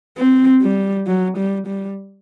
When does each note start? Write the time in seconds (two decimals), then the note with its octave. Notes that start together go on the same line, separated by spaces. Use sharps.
0.17 C4
0.62 G3
1.07 F#3
1.37 G3
1.67 G3